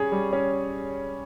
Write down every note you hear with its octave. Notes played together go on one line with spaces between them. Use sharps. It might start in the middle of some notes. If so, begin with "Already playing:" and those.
Already playing: G3 C#4 G#4 C#5
G3
C#4